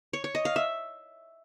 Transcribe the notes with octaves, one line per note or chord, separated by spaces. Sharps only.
C#5
C#5
D#5
F5
E5